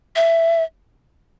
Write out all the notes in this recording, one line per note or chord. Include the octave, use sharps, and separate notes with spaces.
E5